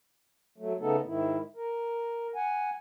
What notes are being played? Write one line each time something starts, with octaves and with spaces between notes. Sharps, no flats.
F#3 A3
C#3 A3 B3 D#4 A4
G#2 D#3 E4
A#4
F#5 G#5